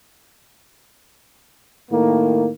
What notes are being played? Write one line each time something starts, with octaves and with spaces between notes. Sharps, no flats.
A2 D#3 A#3